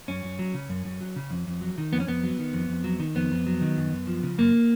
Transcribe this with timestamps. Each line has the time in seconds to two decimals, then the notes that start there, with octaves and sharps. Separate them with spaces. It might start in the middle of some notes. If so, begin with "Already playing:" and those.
0.08 F#2 C#4
0.24 F#2
0.39 F#3
0.54 C#3
0.69 F#2
0.85 F#2
1.01 F#3
1.16 C#3
1.31 F2
1.47 F2
1.61 F#3
1.78 D#3
1.92 F2 B3
2.00 C#4
2.08 F2 B3
2.23 F#3
2.39 D#3
2.53 F2
2.69 F2
2.84 F#3
3.00 D#3
3.15 F2 B3
3.31 F2
3.47 F#3
3.61 D#3
3.77 F#2
3.92 F#2
4.07 F3
4.23 C#3
4.38 F#2 A#3